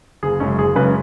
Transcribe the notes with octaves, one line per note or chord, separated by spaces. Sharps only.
F#1 G#4
F#2 C#3 G#3 C#4
F#1 G#4
F#2 C#3 G#3 B4